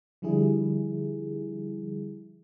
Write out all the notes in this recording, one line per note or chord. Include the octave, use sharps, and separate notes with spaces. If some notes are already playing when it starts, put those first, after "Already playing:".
D3 F3 G3 E4 G#4